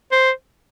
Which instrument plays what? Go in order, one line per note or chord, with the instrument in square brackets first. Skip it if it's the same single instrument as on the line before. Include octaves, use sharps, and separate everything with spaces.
[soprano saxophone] C5